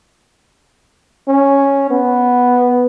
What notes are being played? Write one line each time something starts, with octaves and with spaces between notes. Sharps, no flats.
C#4
B3